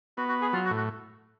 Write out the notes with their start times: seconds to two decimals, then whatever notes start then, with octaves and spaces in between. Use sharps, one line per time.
0.17 B3 F#4
0.29 F#4
0.42 G#4
0.53 F#3 F4
0.65 F#4
0.71 A2
0.77 F#4